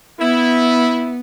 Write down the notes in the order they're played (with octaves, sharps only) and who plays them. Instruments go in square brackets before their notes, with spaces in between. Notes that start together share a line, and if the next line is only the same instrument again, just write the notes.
[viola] B3 [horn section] E4